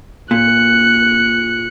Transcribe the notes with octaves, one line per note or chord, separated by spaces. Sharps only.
A#2 F#6 C#7